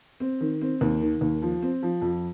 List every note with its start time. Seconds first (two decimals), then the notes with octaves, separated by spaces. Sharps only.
0.20 C4
0.41 D#3
0.61 C4
0.81 D#2
1.01 D#3
1.21 D#2
1.42 F3
1.62 C4
1.83 F3
2.01 F2